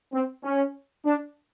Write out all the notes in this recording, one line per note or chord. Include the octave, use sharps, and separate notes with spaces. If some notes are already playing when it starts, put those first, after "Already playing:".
C4
C#4
D4